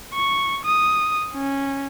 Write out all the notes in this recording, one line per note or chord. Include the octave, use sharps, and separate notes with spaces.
C#6
D#6
C#4